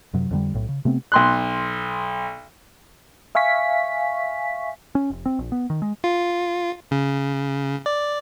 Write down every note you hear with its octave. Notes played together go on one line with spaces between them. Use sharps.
F#2 C3 F#3
F2 D3 G3
B1 A2
C#3
C3 A3 B3 C4
B1 C6 F#6
E5 F5 G#5 C#6 B6
C#4
F1
C4
A#1
B3
D#3
G#3
F4
C#3
D5